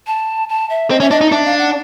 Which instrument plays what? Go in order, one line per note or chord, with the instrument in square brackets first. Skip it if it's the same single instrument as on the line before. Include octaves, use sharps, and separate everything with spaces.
[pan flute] A5
A5
E5
[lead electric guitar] C4 [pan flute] D#5
[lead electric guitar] C#4 [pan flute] E5
[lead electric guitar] D4 [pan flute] D#5
[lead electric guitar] D#4
[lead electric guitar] D4 [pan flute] E5
[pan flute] F5
F#5